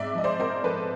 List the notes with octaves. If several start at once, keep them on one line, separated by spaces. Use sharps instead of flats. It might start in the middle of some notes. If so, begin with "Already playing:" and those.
Already playing: G#2 D5 E5
F3 D#5
C5 D5
G#2 A#4 C5
F3 A4 B4